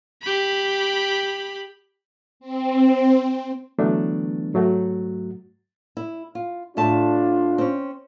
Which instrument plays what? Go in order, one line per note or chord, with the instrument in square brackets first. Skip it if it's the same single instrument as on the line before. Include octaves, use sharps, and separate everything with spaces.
[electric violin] G4 B5
[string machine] C4
[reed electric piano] D3 E3 F#3 A3 B3 D4
G#2 F#3 A3 F#4
[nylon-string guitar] E4
F4
[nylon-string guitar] A2 E5 A5 [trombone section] D4 F4
[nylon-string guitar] C4 C#4